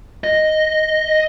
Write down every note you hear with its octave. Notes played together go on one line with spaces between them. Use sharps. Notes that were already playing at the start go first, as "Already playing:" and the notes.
D#5